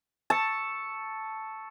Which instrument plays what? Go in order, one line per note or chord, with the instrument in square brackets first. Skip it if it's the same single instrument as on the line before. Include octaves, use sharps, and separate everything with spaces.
[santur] A5 [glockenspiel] C#6 E6 C#7